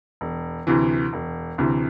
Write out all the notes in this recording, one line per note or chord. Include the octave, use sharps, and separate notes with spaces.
E1
D2 C3 E3
E1
D2 C3 E3